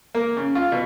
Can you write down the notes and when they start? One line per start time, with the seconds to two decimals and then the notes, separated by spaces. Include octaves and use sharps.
0.15 A#3
0.37 C#3
0.55 F4
0.72 B2